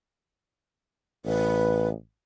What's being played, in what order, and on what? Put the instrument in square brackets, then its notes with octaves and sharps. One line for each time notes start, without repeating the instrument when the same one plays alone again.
[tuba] A1 [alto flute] B4